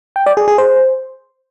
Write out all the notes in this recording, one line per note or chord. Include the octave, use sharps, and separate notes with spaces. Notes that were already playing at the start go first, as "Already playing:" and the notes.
G5
D5
G#4
G#4
C5